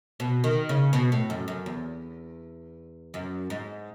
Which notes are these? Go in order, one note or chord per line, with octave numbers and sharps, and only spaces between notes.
B2
D#3
C#3
B2
A2
F#2
F#2
E2
F#2
G#2